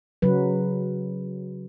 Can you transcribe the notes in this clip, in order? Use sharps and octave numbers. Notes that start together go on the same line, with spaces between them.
C#3 F#3 B4